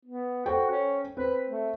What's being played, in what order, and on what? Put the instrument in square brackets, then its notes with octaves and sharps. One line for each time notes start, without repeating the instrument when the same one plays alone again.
[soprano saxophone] B3
[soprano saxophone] F#4 [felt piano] A4 C5 G5
[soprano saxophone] C#4
[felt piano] C4 [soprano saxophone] B4
[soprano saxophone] A3